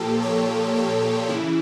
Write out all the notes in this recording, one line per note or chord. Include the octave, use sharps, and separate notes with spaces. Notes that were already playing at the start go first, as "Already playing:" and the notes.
Already playing: A#2 F3 A#3 G4 A4
C#5
A4
C#3 E3 E4